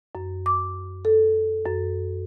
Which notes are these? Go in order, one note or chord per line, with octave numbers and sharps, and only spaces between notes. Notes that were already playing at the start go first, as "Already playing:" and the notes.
F#2
D6
A4
F#2